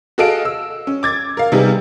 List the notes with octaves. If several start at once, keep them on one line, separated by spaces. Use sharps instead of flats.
F#4 G#4 A4 D#5 F5 D7
E6
C#4
D6 G#6 A6
A#4 F5
C3 G3 B3 D#4 G#4